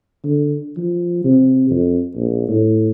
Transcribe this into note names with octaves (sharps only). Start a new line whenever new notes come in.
D3
F3
C3
F2
A#1
A2